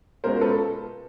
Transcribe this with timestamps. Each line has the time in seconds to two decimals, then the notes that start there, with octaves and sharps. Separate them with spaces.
0.24 B2 G#3 C#4 F4 A#4 C5
0.41 A4 B4